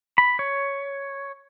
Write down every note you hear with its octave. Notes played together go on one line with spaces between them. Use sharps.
B5
C#5